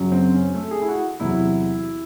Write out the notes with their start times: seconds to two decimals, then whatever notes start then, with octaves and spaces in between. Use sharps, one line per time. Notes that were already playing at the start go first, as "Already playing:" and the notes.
Already playing: F#2 C#3 F#3
0.12 C4
0.34 C#4
0.55 A3
0.71 G#4
0.81 E4
0.88 F#4
1.20 E2 C3 F#3 E4